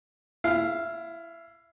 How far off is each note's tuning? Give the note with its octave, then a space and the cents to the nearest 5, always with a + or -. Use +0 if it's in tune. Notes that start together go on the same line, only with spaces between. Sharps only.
E4 +20 F5 -5